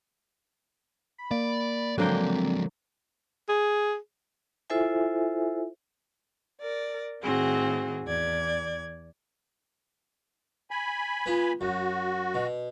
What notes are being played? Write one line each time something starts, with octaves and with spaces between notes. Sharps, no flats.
B5
A#3 D5
D3 F3 F#3 G#3 A#3 C4 G5
G#4
E4 F4 A4 C5 E5 G#5
A#4 D5
A2 D#3 C4 F#4 G#4
E2 D5 G#6
G#5 B5
B3 F4
F#2 F#4
B2